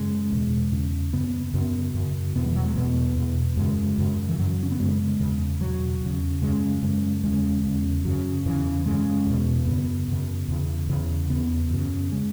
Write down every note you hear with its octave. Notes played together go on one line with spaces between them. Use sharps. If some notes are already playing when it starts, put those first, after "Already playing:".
Already playing: F#2 C#3 G#3
E2 B2
E2 C#3
F#2 C#3 B3
F#2 C#3 B3
F#2 C#3
E2 B2 B3
F#3
E3
F#3
G#3
E2 B2 B3
E2 B2
F#2 C#3 G#3
F#2 C#3
E3
F#2 C#3 F#3
C#4
B3
F#2 C#3 G#3
E2 C#3
E2 B2 F#3
E2 C#3
F#2 C#3 G#3
F#2 C#3 G#3
E2 C#3 G#3
E2 C#3
F#2 C#3 F#3
E2 C#3 E3
F#2 C#3 G#3
E2 B2
F#2 C#3 B3
F#2 C#3
E2 C#3
E2 C#3
E2 C#3 B3
F#2 C#3
C#3 G#3